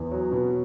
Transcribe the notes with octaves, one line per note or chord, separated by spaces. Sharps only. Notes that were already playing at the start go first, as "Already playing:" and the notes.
Already playing: E2
F#3
B2